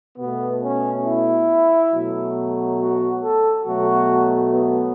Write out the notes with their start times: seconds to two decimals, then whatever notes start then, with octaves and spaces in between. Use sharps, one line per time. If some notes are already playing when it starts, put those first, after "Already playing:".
0.18 B2 A3 B3
0.62 C#4
1.05 E4
1.92 B2 F#3 A3
2.79 F#4
3.22 A4
3.65 B2 F#3 A3 F#4
4.52 B3